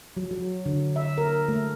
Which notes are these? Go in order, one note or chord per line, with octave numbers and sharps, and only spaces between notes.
F#3
F#3
D3
E5
A#4
A3